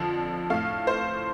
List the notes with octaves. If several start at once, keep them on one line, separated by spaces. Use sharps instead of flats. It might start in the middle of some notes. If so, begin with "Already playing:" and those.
Already playing: F2 D3 F3
A2 A3 F5
C5